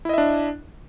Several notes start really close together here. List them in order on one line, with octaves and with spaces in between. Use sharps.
E4 D#5 E5 D4